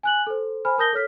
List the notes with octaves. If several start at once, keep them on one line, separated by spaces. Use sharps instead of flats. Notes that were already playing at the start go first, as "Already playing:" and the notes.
G#5 F#6 F#7
A4 C5
C5 G#5 B5 F6
A#4 A5 D#6 G6 A#6 G7
A4 C#5 F6 B6